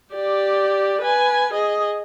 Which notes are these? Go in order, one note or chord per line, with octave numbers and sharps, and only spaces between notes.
G4 D5
B4 G#5
G#4 D#5